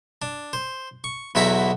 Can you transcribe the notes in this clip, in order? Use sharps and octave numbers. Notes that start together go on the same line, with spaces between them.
D4
C5
C#6
B1 E2 E4 F#4 A#5 B5